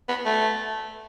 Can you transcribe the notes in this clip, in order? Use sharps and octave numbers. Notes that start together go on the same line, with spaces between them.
B3
A3